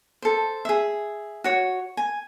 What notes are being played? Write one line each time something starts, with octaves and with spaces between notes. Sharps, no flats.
A4 C5
G#4 E5
F#4 C#5
G#5